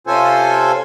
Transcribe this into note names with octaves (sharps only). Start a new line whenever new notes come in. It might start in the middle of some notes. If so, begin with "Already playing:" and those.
C3 C#4 F4 A4 C5 G#5